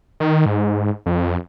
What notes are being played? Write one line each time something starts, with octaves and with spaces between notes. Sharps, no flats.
D#3
G#2
F2